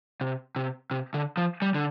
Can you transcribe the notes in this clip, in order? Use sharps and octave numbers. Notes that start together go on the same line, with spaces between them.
C3
C3
C3
D3
F3
G3
D3